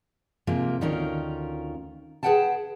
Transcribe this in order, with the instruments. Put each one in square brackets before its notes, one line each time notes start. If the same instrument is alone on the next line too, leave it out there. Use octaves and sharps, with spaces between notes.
[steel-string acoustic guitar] G#2 C3 F3 A#3 F4
D2 D#3 C#4 F4 A#4
G#4 A#4 B4 F#5 G5 A5